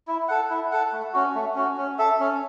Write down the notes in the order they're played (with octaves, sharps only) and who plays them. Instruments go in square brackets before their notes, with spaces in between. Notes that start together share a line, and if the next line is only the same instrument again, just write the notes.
[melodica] E4
A4 F#5
E4
A4 F#5
A3
C#4 F#4
A3
C#4 F#4
C#4
A4 E5
C#4